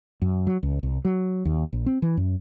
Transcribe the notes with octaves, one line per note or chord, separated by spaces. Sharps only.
F#2
F#3
C#2
C2
F#3
D#2
A#1
C4
E3
F#2